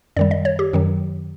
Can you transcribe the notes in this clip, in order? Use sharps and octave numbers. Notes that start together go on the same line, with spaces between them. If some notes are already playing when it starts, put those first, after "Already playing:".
F#2 D#3 G3 D5
D#5
C#5
G4
F#2 D#3 F#3